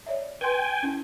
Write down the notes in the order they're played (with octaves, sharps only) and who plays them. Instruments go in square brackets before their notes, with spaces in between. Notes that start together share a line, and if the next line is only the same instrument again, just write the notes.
[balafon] C#5 D5 E5
[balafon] B4 C6 [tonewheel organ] G5 G#5
[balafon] C#4 E4